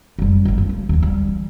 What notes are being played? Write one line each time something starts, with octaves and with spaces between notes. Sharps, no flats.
F#1 G3
A1 F#3
D3
A#3
D#2 B3
E3 G3